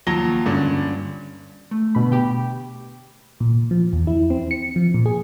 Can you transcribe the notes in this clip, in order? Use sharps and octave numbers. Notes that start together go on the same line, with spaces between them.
D#2 F3 F#3 A5 A#6 G7
G2 D3 C#4
A3
B2 D3 B5
G4 G5
A#2
F3
E2
E4
C4
C#7
F3
A#2
G#4